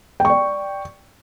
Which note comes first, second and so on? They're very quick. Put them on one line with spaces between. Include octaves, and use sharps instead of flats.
G5 C#6 D5